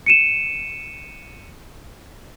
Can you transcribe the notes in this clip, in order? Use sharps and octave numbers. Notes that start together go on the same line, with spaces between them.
C#7 D#7 E7